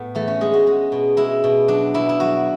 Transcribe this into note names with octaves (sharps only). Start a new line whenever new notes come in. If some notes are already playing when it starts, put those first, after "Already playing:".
Already playing: A2 B3
E3 A3
C#4
G#3 G#4
F#4
G#3
B2
G#3 E4
B2
F#3 D4
B2 E4
E4
F#3 F#4